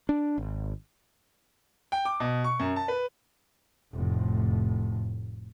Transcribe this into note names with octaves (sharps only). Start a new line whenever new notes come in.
D4
G#1
G5
D6
B2
C#6
F#2
A5
B4
F1 A2